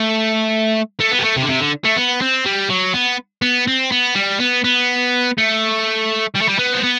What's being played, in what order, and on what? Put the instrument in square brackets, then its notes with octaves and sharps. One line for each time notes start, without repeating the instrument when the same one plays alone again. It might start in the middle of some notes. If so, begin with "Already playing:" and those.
Already playing: [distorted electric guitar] A3
A3
B3
G3
A3
C3
D3
C3
D3
A3
B3
C4
G3
F#3
B3
B3
C4
B3
G3
B3
B3
A3
G3
A3
G3
B3
C4
B3